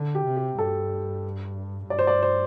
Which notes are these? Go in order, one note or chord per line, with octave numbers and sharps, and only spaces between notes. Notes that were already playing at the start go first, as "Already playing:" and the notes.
Already playing: D3
G4
C3
G4
G2 A4
G2 D5
C5
D5
C5